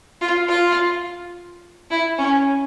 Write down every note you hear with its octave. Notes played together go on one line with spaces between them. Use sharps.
F4
F4
E4
C#4